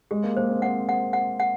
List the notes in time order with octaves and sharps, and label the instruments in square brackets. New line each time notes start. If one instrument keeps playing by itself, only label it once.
[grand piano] G#3 [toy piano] G4
[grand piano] A#3
[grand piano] A#3 [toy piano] C5
[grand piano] C4
[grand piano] C4 [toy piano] F#5
[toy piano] F#5
F#5
F#5